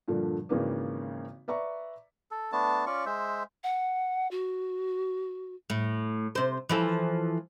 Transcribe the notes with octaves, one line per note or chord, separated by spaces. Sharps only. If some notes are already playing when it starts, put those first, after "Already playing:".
G2 A#2 D3 F3
G#1 C#3 E3 A#3 B4 D5
B4 D5 E5 A#5 C#6
A4
A3 B3 D4 A5
C#4 F4 D5 C#6
G#3 C5 E5
F#5
F#4
A2
C3 C5
E3 F3 A4